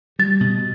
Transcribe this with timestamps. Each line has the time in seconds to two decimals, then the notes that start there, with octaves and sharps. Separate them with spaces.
0.19 G3 A6
0.40 B2